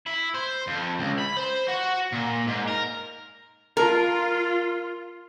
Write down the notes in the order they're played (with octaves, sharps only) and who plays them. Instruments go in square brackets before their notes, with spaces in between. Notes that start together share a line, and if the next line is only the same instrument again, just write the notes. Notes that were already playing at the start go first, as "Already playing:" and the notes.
[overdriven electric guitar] E4
C5
F2
C#2
B5
C5
F#4
A#2
G#2
A#4
[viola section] F4 [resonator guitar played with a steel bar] A#4